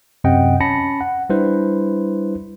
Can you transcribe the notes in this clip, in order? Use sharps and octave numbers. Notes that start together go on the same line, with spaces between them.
F#2 C3 C4 D#5 F#5 G5
C#4 A5 B5 A#6 C#7
F#5
G3 D4 E4 B4 C5